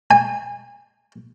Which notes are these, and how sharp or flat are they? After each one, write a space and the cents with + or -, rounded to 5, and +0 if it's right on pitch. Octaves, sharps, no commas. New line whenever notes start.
G#5 -25